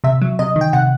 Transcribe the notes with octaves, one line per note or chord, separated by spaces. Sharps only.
C3 E5
F#3
C3 D#5
D#3
G5
C3 F#5